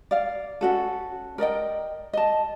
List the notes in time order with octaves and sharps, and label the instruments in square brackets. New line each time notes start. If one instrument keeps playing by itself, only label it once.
[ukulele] D5 F5
C#4 F#4 A4
A#4 D5 D#5 G5
D#5 A5